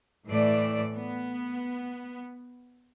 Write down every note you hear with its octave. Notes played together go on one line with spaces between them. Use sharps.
A2 E3 A3 D5
B3